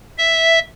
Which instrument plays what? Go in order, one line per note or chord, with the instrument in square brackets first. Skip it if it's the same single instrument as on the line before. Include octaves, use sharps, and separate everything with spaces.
[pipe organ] E5